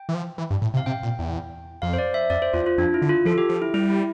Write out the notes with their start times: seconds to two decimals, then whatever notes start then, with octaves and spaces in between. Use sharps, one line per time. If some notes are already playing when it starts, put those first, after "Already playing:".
Already playing: G5
0.09 E3
0.15 F3
0.38 E3
0.51 G2
0.62 A2
0.74 C3
0.77 F5
0.86 C3 G5
1.03 A#2
1.19 E2
1.82 F2 F5
1.93 C5
1.98 D5
2.14 E5
2.30 F2 D5
2.42 C5
2.53 E2 F4
2.66 F4
2.78 F2 D4
2.94 E4
3.02 D3
3.09 F4
3.25 F3 A4
3.38 G4
3.49 F3
3.62 E4
3.74 G3 E4
3.90 E4